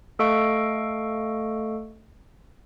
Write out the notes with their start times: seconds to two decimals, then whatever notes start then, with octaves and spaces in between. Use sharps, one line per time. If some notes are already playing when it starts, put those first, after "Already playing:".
0.19 A3 A4 D#5 F5 C#6 D7